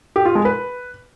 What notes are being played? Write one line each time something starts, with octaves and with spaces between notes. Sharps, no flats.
G4
F4
G#3
B4